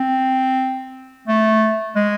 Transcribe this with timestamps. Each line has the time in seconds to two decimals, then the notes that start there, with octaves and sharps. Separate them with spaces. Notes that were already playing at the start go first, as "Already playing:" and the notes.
Already playing: C4
1.28 A3
1.96 G#3